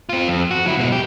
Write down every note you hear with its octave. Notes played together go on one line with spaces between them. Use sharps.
C4 F4
F2
F#4
F#3 E4
B2 G#3
G4